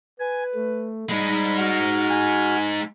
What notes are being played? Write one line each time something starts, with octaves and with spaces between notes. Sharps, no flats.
B4 G#5
A3
G3 G#3 D#4 B5
F#4 F6
G#5